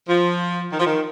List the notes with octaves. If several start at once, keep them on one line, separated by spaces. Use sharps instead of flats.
F3
D#3
F3
D#3